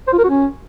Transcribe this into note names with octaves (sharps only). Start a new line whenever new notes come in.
C5
F4
A#4
F#4
C#4